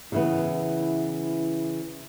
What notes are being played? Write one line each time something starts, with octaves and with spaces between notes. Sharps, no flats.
C#3 E3 B3 E4